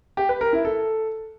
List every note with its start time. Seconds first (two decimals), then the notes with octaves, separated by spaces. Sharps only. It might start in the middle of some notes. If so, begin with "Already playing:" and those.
0.17 G4
0.29 B4
0.41 A#4
0.53 E4
0.65 A4